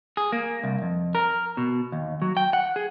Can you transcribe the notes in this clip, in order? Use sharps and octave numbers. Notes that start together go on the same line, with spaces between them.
G#4
A#3
C2
F2
A#4
B2
D#2
F#3
G5
F#5
G#4